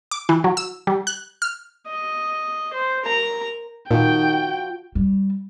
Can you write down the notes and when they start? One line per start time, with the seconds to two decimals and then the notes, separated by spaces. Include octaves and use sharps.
0.11 D6
0.29 E3
0.44 F#3
0.57 E6
0.87 G3
1.07 F#6
1.42 F6
1.87 D#5
2.73 C5
3.05 A#4 A#5
3.91 A#2 D#3 F3 F#4 G5
4.95 G3